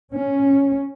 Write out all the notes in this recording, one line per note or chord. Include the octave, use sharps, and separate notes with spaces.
C#4